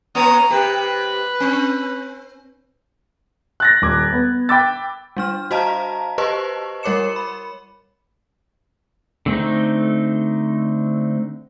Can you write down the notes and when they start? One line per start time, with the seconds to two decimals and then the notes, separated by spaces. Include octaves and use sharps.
0.15 A#3 C#5 A#5 D#6
0.50 C3 G4 B4
1.40 C4
3.60 F#6 A6 A#6
3.82 D#1 D6 G#6
4.13 B3
4.49 G5 B5 D6 E6 A6
5.17 G3 D4 F6
5.51 F#4 C5 D#5 F5 A5 A#5
6.18 G4 B4 C5 D#5 A5 C#6
6.83 G3 A#4 C#5 D6 C#7 E7
7.16 B5
9.26 D3 A3 C4 D#4